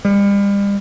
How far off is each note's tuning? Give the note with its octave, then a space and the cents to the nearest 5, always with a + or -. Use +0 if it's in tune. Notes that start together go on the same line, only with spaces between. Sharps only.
G3 +40